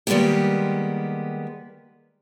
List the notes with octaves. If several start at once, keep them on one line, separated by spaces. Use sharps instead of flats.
D#3 G3 G#3 A#3 B3 G4